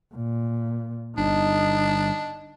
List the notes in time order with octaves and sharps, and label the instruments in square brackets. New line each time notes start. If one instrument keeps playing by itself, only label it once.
[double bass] A#2
[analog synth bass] G1 [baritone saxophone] D4 [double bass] D#4